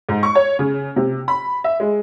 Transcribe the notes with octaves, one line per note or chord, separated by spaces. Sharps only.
G#2
C#6
C#5
C#3
C3
B5
E5
G#3